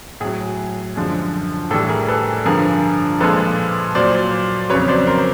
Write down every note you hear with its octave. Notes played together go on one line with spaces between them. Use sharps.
A2 F#3 G#4
F#2 D3 F3 G#3
A2 E3 G3 A4
G#4 A#4
A4 B4
G2 D3 F3 G#4 A#4
A#2 F3 G#3 A4 B4
A#2 F#3 C5 D5
F2 C#3 F#3 B4 C#5
C5 D5
A#4 C5